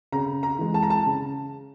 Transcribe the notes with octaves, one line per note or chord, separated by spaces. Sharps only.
C#3 A#5
A#5
E3 G#3
A5
A#5
A5
C#3